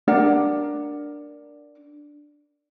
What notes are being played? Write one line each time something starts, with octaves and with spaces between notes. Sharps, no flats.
D4 A#4 D5 F#5